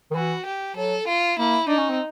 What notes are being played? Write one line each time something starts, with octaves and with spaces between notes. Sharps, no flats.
D#3
E3 F#4
G4
F#3 A4
F4
A#3 E4
D4 D#4
C#4
C4